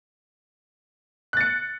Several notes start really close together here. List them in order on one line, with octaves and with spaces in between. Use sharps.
F#6 A6 C#7